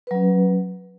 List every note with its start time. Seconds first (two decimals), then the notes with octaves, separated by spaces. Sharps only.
0.07 B4
0.11 F#3
0.15 C#4